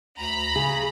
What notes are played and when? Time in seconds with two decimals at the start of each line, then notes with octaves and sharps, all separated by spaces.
0.18 D2 A#5 B5
0.56 C#3 G#4